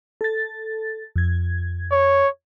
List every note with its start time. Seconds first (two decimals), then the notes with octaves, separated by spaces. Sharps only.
0.21 A4 A6
1.16 F2 G#6
1.92 C#5